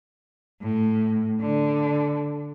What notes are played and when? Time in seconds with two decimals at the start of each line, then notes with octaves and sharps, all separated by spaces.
0.62 A2
1.41 D3